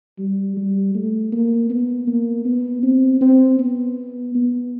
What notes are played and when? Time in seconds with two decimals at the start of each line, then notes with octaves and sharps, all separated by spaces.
0.19 G3
0.57 G3
0.95 A3
1.33 A#3
1.70 B3
2.08 A#3
2.45 B3
2.83 C4
3.21 C4
3.59 B3
4.35 B3